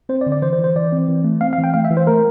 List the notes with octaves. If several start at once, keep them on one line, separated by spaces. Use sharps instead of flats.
C4 C5
D5
D3
D5
E3 C5
C5
E3
C5
E3 D5
C4
E3
A3
C4 F5
F5
E3
G5
A3 F5
E5
E3
C5
A3 A#4